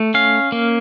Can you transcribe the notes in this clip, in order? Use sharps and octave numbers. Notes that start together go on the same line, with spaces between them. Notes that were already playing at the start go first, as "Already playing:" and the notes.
Already playing: A3
C#4 F5
A#3